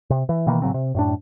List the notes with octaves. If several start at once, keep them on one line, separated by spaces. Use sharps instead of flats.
C3
E3
B2 D#3 E3 A#3
A2 C#3 F#3 C4
C3
F#2 A2 D4